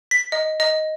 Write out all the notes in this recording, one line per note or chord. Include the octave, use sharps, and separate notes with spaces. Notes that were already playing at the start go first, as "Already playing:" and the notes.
B6
D#5
D#5